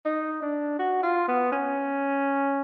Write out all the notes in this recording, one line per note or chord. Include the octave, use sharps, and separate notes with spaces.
D#4
D4
F#4
F4
B3
C#4